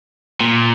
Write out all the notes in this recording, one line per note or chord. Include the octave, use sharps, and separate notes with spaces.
A#2